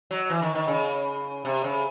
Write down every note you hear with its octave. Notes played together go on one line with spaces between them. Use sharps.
F#3
E3
D#3
D#3
C#3
C3
C#3